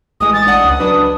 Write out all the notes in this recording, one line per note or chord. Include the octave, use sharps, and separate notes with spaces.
A1 G#3 D#6
A6
D4 F#5 D#6
C#2
F#3 D4 B4